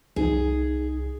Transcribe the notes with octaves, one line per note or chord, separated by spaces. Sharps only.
C2 D#4 G#4